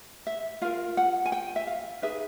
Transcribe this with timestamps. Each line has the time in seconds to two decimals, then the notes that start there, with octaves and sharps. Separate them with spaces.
0.27 E5
0.62 F4 A#4 F5
0.97 F#5
1.26 G#5
1.32 G5
1.56 E5
1.67 F5
2.02 D#4 G#4 B4 E5